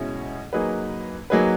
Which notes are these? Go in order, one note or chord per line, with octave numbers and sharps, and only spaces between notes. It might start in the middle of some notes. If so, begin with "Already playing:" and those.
Already playing: B2 G#3 C#4 E4
F#3 A#3 D#4 G#4 B4
F#3 A#3 D#4 G#4 B4